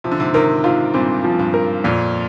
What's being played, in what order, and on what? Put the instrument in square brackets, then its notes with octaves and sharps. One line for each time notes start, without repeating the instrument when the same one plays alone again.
[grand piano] C3 [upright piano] F3
[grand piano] D3
G#2 C3
[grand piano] C3 D#3 [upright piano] A#4
[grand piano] G#2 C3 [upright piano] F4
[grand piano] G2 A#2 [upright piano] C4
[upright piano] F3
[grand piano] G2
[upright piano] A#4
[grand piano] F2 [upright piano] A#2